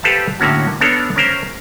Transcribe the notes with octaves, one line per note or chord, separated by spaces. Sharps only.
G4 A4 B4 C5 F5 A5
A2 D3 A#3 C#4 F#4
B3 D4 A4 A#4 C#5
C#4 A#4 C5